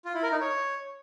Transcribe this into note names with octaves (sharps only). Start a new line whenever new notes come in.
F4
E4
A#4
D#4
C#5